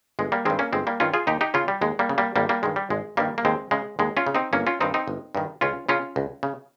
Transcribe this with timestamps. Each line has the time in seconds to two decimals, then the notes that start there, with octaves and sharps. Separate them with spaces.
0.19 G1 G#3
0.32 G3 A#3
0.45 G2 D#3 G#3 C4
0.59 A#3 C#4
0.73 G1 G#3 C4
0.87 G3 A#3
1.00 G2 D#3 C#4 F4
1.14 F4 G#4
1.27 D#2 D#4 G4
1.41 D#4 G4
1.54 C#3 C#4 F4
1.68 G3
1.81 D#2 G#3
1.99 G3 A#3
2.09 C#3
2.18 G3 A#3
2.36 G#1 G3 A#3
2.49 G3 A#3
2.63 G2 D#3 G#3
2.76 G3
2.90 G#1 G#3
3.17 G2 D#3 G3 A#3
3.38 A#3
3.45 D#2 G#3 C4
3.71 C#3 G#3
3.99 D#2 G#3
4.17 C#4 F4
4.26 C#3
4.35 C4 D#4
4.53 G1 A#3 C#4
4.67 C#4 F4
4.80 G2 D#3 C4 D#4
4.94 C4 D#4
5.08 G1
5.35 G2 D#3
5.61 C#2 C#4 F4
5.89 C#3 C#4 F4
6.16 C#2
6.43 C#3